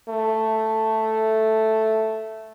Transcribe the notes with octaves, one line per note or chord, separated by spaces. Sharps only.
A3